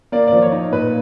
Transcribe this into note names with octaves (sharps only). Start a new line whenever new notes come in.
A#3 D5
F3 D5
C#5
D#4
A#2 B4